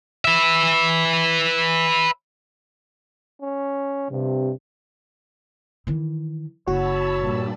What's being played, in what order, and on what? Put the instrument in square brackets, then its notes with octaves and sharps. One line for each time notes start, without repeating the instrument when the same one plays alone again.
[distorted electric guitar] B4 E5
[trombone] C#4
[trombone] G2 [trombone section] C3
[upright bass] D#3 E3
[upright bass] F#1 [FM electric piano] F#4 [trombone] C#5 [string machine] A5 B5 E6
[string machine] G2 A#2 G3